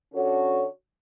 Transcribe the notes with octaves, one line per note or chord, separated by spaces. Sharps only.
D3 C#4 F#4 A4 C#5